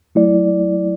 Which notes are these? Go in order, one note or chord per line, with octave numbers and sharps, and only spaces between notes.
F#3 A3 E4 D5